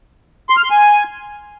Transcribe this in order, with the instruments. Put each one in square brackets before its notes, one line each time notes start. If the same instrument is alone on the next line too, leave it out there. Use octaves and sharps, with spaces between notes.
[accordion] C6
F6
C6
G#5